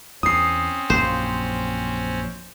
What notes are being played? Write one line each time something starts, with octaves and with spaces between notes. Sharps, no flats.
E2 C4 C#4 D#6 C7
A#1 F#2 C5